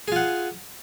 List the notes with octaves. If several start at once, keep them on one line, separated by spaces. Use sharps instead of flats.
F4 G#4 F#5